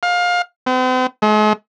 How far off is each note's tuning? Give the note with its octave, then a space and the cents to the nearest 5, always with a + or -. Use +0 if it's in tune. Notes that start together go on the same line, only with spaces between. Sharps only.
F5 +25
C4 -45
G#3 +45